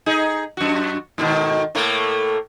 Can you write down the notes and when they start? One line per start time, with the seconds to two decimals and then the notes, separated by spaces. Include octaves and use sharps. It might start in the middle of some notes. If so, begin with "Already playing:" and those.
0.06 D#4 G#4
0.57 F#2 F#4
1.18 G#2 B2 D#3
1.75 A2 A3 A#3